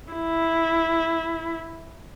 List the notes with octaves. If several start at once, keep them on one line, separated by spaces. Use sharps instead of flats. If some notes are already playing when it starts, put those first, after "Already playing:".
E4